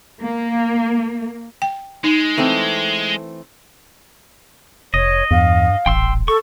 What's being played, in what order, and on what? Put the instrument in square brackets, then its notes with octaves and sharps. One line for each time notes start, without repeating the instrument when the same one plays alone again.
[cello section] A#3
[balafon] G5
[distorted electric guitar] G#3 [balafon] D#4
[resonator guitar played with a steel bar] E3 A3 C4
[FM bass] F1 [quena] C#5 [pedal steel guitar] D#5
[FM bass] E2 [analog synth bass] G2 [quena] F5
[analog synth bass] D#1 [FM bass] A1 [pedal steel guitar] G5 C6 E6
[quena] A4 [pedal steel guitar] C#6